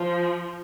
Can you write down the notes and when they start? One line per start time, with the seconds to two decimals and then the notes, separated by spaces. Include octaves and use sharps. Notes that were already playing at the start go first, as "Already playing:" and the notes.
Already playing: F3